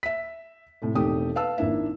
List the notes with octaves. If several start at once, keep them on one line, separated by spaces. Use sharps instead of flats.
E5 B6
A2 C3 A3
E1 D#3 A3 C4 G4 D#6
B4 F5 A5 E6
G#1 A#3 D4 E4 E5